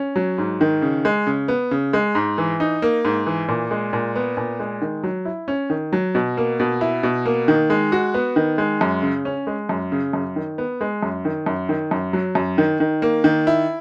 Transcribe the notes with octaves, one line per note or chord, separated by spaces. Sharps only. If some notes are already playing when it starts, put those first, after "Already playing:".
Already playing: C#4
F#3
G#2
D#3
C#3
G#3
C#3
B3
C#3
G#3
G#2
E3
D#4
A#3
G#2
E3
A#2
G#3
A#2
B3
A#2
G#3
D#3
F#3
E4
C#4
D#3
F#3
B2
A#3
B2
E4
B2
A#3
D#3
G#3
F#4
B3
D#3
G#3
F#2
C#3
C#4
G#3
F#2
C#3
F#2
D#3
B3
G#3
F#2
D#3
F#2
D#3
F#2
F#3
F#2
D#3
D#3
A#3
D#3
E4